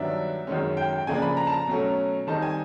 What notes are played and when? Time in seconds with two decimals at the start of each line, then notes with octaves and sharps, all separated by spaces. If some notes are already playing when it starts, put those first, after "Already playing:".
Already playing: G2 D#3 F#3 B3 D4 E5
0.47 F#2 D#3 G#3 C#4
0.77 G5
0.93 G5
1.07 C#3 F3 A#3 D4 G#5
1.22 B5
1.37 A#5
1.47 A5
1.53 A#5
1.67 B2 F#3 A3 C#4
2.27 D#3 G3 C4 D#4 A5
2.42 G#5